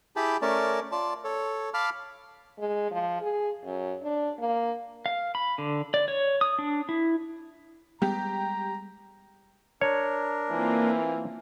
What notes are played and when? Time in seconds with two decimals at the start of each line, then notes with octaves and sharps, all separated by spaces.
0.16 E4 G4 G#4 G5 A5 B5
0.42 A3 C#4 A#4 D5 A5
0.92 F4 D5 A5
1.24 A4 C#5
1.74 F5 A5 B5 D6 F6
2.58 G#3
2.91 F3
3.21 G#4
3.64 F#2
4.03 D4
4.39 A#3
5.06 F5
5.35 B5
5.58 D3
5.94 D5
6.08 C#5
6.41 D#6
6.59 D4
6.89 E4
8.02 G3 G#3 B3 G4 A#5
9.81 D4 A#4 C#5
10.51 E3 A#3 C4 F4